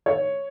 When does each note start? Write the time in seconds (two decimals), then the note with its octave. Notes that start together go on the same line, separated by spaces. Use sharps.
0.06 C#5